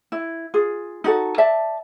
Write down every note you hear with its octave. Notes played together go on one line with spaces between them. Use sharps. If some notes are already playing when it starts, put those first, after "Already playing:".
E4
F4 G#4
D#4 F#4 A4
D5 E5 A5